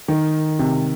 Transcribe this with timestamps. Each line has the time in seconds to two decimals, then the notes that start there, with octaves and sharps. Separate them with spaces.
0.08 D#3
0.59 C3